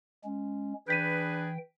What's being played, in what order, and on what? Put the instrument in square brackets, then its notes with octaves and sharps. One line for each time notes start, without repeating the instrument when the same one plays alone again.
[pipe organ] G#3 C#4
[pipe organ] E3 G5 [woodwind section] D4 G#4 B4 [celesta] G6 B6 D#7